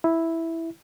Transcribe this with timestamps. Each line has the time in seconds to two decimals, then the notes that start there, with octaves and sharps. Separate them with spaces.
0.04 E4